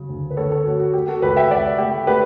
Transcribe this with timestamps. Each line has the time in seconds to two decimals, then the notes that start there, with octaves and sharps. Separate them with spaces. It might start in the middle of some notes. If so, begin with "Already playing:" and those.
Already playing: C#3 F#3
0.08 D2
0.30 B4
0.37 D2 A4 C#5
0.51 A4 C#5
0.66 A3 F#4
0.80 F#4
0.93 A3 G4
1.08 F#4 A4
1.22 C#2 G4 B4
1.37 E5 G5
1.50 C#2 D5 F#5
1.78 A3 G4
2.07 A3 G4 B4